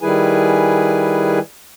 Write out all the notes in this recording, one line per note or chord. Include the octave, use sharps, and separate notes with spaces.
D#3 G3 E4 G#4 B4 G#5